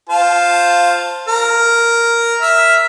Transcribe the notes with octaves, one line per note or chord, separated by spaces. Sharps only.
F4 C5 A5
A#4
E5 F6